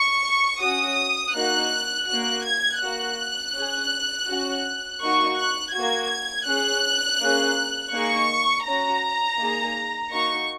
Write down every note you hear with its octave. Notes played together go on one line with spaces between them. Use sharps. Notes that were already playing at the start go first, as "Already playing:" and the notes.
Already playing: C#6
C#4 F#4 D#6
A#3 D#4 F#4 F#6
A#3 F#4 F#6
G#6
A#3 F#4 F#6
C#4 G#4
C#4 F#4
A#3 D#4 F#4 C#6
F#6
A#3 F#4 G#6
C#4 G#4 F#6
A#3 C#4 G#4
A#3 D#4 G#4 C#6
C#4 F#4 A#5
A#3 D#4 G#4
A#3 D#4 F#4 C#6